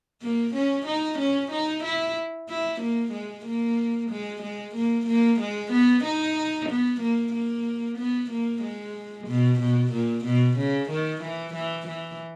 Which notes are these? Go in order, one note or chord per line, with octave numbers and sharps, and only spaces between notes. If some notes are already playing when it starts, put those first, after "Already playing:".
A#3
C#4
D#4
C#4
D#4
E4
E4
A#3
G#3
A#3
G#3
G#3
A#3
A#3
G#3
B3
D#4
B3
A#3
A#3
B3
A#3
G#3
B2
B2
A#2
B2
C#3
D#3
E3
E3
E3